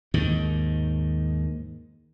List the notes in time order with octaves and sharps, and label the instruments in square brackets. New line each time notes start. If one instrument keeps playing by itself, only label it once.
[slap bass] D#2 G#2 D#3